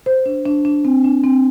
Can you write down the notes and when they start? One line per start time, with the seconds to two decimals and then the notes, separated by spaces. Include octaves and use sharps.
0.06 C5
0.26 D4
0.45 D4
0.65 D4
0.85 C4
1.04 D4
1.24 C4